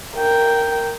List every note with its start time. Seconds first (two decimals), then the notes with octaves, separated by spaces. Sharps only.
0.17 A#4 G5